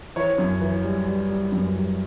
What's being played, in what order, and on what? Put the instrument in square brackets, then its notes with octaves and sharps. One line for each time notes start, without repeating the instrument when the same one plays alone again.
[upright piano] E3 C#5
F#2
E3
G3
G3
G3
F#2
G3